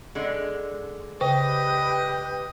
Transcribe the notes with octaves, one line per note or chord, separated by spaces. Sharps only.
D3 G#3
C#3 G4 B4 C5 D#5 G5